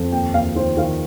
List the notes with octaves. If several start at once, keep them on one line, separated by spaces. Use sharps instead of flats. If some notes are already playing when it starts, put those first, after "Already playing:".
Already playing: F2
D#2 G5
D#2 F5
D#3 C5
D#3 F5